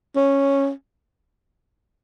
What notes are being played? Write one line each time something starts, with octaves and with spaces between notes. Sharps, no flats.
C#4